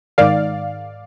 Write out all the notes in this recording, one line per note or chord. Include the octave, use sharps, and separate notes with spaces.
G#2 D#3 D5 F5